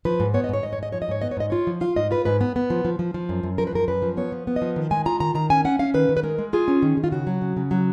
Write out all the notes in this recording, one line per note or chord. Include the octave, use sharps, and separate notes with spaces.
F3 B4
G#2
B3 C#5
D#5
G#2 C#5
G#2 D#5
C#5
G#2 D#5
F3 C#5
D#5
G#2 C#5
B3 D#5
C#5
G#2 D#5
F4 C#5
F3
F4 F5
G#2 D#5
F4 B4
G#2 B4
B3
B3
F3
F3
F3
F3
F#2
F#2
F3 A#4
B4
F#2 A#4
F#2 B4
F3
B3 C#5
F3
B3
D#5
F3
D#3
G#3 G#5
F4 A#5
D#3 A#5
D#3 A#5
C#4 G#5
C#4 F#5
C#4 F5
D#3 B4
D#3
B4
G#3 A#4
G#3
F4 G#4
C#4
D#3
D#3
F4
C#3 F#4
F#3
C#3
C#3
F#3